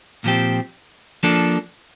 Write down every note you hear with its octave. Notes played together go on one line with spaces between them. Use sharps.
A#2 F3 C4 G4
F3 A#3 D4 A4